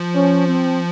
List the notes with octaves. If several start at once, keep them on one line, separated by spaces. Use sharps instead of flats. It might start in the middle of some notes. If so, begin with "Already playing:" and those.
Already playing: F3
C#4
C4